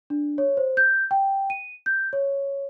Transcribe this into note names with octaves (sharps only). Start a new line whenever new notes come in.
D4
C#5
C5
G6
G5
D#7
G6
C#5